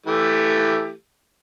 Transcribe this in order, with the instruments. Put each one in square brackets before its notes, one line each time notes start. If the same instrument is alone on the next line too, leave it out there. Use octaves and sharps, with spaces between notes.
[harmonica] E3 A3 G4